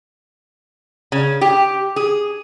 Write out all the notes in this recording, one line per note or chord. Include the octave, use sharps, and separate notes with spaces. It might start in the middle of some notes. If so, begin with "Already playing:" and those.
C#3
G4
G#4